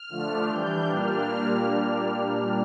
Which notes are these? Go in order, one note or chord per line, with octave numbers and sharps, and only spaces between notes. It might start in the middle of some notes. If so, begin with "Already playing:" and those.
Already playing: F6
D3 F3 A3 D4
E3 G3 D4 G6
A#2 G3 A#3 D4 F6